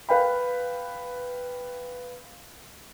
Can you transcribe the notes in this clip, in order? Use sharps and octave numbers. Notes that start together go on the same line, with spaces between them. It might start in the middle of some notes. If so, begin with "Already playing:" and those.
B4 F5 G5 B5